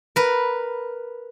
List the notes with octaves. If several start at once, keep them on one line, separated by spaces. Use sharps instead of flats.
A#4 B4